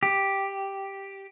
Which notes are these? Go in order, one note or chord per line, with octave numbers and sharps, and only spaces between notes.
G4